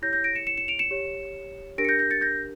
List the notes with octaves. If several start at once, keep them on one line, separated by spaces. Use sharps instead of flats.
E4 G4 C#5 G6 A#6
G6 A#6
A#6 D7
C#7 E7
C#7 E7
C#7 E7
D7 F7
C#7 E7
G4 C#5
D4 G4 A#4 A#6 D7
C#7
G6 A#6
G6 A#6
A6 C#7
G6 A#6